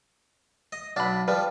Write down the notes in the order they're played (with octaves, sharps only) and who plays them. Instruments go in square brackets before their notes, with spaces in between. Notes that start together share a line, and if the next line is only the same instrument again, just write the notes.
[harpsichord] D#5
[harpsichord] B1 D4 [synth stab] D5 B5
[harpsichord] F3 G3 [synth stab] B4 D5